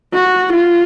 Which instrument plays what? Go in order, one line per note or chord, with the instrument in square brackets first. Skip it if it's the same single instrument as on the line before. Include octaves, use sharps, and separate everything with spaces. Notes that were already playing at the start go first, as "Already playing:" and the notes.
[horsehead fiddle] F#4
F4